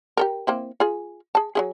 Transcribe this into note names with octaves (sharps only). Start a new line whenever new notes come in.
G4 A4 A#4
A#3 C4 E4
F4 G#4
G#4 A5
F#3 E4 G#4